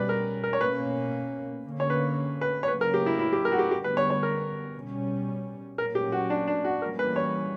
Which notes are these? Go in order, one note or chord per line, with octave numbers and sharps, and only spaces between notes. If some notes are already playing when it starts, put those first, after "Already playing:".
Already playing: B2 G3 C#4 B4 D5
A#4
A#4
C#5
B2 A#3 C#4 B4
D3 A#3 C#4
C#5
B4
B4
C#5
C#3 F#3 A#3 C#4 B4
A#4
G4
E4
E4
G4
A#4
F#4
G4
D3 G3 B3 G4
B4
C#5
C#5
A#4
B2 G3 C#4
A#2 F#3 A#3 C#4 A#4
G4
F#4
D4
D4
F#4
E3 G3 A#3 C#4 A#4
B4
C#5